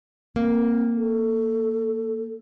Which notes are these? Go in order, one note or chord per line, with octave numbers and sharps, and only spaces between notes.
A#3 C4
A4